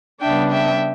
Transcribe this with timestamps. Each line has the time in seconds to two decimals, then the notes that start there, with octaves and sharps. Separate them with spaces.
0.21 C#3 G3 B3 D4 E5 G5
0.51 E5 G5